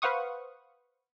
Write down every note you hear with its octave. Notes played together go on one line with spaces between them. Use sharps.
B4 C5 F5 F#5 C#6 D#6